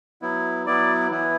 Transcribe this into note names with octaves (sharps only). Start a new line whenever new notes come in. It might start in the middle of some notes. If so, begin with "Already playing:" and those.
F#3 B3 E4
F#3 B3 E4 D5
E3 B3 E4